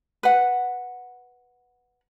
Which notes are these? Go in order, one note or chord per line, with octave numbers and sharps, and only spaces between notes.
B4 F#5